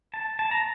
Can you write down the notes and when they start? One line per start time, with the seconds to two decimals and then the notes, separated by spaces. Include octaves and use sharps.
0.14 A5
0.39 A5
0.51 A#5